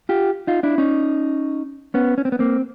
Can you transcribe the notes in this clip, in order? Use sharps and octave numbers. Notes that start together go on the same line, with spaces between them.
F4 G4
D#4 F4
D4 E4
C#4 D#4
B3 C#4
C#4
C4
B3
A#3 C4